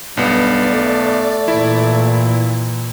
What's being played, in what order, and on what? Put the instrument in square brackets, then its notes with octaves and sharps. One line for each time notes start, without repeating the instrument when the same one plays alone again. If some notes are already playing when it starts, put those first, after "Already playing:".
[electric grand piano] B1 B3 [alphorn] G2 [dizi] D5
[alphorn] A3
[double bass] A#2 E3 [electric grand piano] E4